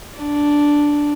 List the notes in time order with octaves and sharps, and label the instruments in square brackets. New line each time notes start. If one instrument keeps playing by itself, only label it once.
[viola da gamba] D4